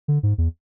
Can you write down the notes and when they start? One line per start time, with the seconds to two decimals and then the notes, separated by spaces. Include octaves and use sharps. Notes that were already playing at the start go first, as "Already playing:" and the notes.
0.08 D3
0.23 G#2
0.38 E2